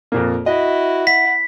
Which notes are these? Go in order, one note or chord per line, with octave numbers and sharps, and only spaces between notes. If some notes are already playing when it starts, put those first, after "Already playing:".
F2 A#2 A#3
E4 F#4 D#5
F#5 B6